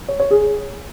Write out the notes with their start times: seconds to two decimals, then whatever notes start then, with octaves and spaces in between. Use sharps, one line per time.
0.08 C#5
0.20 C#5
0.31 G#4